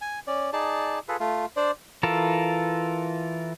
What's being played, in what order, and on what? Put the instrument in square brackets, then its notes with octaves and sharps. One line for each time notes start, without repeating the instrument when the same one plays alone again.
[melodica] G#5
C#4 D5
D#4 G#4 D5 A5
F4 G#4 A4 B4
A3 F4
D4 C5 D5
[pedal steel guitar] E3 F4 A4 A#4